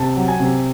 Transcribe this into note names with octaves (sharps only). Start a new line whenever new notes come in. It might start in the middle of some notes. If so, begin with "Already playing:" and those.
Already playing: C3 A5
F#3
G#5
C3